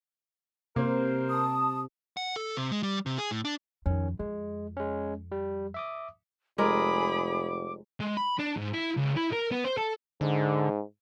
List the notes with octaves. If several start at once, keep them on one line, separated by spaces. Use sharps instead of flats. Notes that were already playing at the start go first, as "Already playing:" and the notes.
C3 A#3 A#4 C5
A5 D#6
F#5
A4
C3
G#3
G3
C3
G#4
A2
D4
F2 D#3 C#4
F2 G#3
G#3 C#4
G3
E5 D6 D#6
F1 G#3 G#4 A#4 B5 D6
G#3
B5
D4
G#2
E4
C#2
E4
A#4
B3
C5
A4
G#2 D3